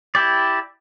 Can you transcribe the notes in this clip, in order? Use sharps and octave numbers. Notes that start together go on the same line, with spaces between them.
E4 G4 D5